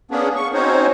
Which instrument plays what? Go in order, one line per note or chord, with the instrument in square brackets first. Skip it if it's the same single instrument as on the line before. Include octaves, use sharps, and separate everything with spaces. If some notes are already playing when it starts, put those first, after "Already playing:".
[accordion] A#3 B3 C#4 D4 G#4
C#6
C4 C#4 D#4 F#4 C5 C#5